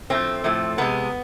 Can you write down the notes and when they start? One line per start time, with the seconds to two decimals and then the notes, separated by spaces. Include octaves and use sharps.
0.10 A2 F3 A3 C4
0.44 A2 F3 A3
0.78 C3 G#3 B3